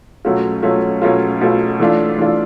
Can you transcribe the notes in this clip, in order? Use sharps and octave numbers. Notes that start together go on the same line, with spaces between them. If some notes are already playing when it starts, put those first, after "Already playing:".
B2 F#3 A3 C#4 F4
B2 F#3 A3 C#4 F4
B2 F#3 A3 C#4 F4
B2 F#3 A3 C#4 F4
E3 A3 D4 F4
E3 A3 D4 F4